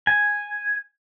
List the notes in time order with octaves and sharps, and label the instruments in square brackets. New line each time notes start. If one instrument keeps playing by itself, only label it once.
[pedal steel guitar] G#5